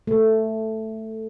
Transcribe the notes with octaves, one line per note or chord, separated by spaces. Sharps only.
A3